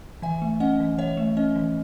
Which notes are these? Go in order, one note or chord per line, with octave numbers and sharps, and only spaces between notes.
E3 E5 G#5
A3
C#4 D#5 F#5
E3
E3 C#5 E5
A3
C#4 D#5
E3